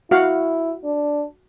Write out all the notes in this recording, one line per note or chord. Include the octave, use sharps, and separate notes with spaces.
E4 F#4 F5 F#5
D4